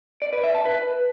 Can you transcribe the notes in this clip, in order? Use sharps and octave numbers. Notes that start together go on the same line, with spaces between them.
D5
B4
E5
A5
B4